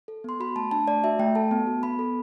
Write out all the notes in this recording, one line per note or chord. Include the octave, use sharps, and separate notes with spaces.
A4
B3 C6
F#4 B5
A3 A5
D4 A5
A3 D5
F#4 E5
A3 G5
A4 A5
B3
F#4
B3 B5
A4